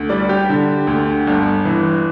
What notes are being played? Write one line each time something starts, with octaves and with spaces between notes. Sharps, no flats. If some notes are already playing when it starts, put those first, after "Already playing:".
Already playing: D2
G3 D5
G4
D3
D2
G1
E3